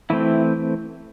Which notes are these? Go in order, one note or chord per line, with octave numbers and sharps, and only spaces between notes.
E3 A3 C4 E4